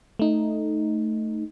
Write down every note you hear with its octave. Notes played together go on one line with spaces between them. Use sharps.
A3 D#4